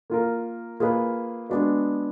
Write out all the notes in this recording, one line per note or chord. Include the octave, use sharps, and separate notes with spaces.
A#3 F4 A#4
A#3 F4 G#4 B4
G#3 B3 D4 F#4 B4